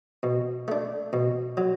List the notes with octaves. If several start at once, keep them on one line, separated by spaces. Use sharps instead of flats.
B2
A3 D4
B2
F#3